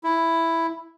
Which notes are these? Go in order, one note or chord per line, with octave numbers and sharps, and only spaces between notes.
E4